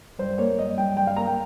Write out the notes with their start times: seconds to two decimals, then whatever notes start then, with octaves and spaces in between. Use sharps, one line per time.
0.19 G2 C5
0.38 A#3 C#5
0.59 G2 D#5
0.78 G2 G5
0.97 G2 G5
1.07 F5
1.16 A#3 A#5
1.27 G5